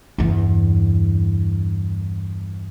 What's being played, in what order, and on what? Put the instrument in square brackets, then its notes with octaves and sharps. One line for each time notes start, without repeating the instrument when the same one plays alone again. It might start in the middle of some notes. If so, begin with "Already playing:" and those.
[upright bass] E2 G2